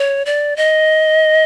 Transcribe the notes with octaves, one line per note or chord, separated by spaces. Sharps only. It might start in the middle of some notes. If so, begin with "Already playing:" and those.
Already playing: C#5
D5
D#5